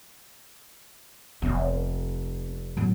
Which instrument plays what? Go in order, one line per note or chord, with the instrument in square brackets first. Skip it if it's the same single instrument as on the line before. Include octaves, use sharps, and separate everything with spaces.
[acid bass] F1 [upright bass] C4
[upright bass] A2 F#3